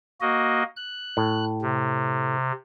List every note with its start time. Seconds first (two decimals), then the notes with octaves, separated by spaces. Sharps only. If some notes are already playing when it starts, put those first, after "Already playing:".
0.21 A#3 F#4 D#5
0.76 F#6
1.17 A2
1.62 C3